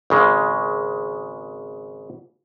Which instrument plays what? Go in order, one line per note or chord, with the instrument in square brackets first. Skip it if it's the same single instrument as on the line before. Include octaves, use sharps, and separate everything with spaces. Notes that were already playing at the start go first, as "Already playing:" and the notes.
[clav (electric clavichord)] G#1 C#3 G#3